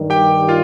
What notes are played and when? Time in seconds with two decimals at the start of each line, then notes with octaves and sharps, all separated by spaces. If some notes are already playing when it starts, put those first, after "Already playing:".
Already playing: G2 D#3 G3
0.10 G4 G5
0.48 F4 F5